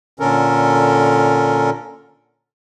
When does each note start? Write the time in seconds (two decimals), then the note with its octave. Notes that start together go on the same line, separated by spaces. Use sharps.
0.20 A#2 D3 C#4 A4 A#4